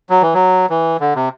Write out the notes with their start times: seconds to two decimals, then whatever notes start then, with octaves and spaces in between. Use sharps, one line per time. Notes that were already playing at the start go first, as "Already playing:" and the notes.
0.10 F#3
0.21 E3
0.34 F#3
0.70 E3
1.00 D3
1.15 C3